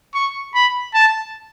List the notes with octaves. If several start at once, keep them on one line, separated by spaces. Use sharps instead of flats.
C#6
B5
A5